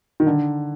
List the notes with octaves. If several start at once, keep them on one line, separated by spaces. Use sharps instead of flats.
D#3
D3